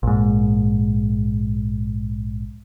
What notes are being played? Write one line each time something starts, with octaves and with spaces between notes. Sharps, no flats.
A#1 G#2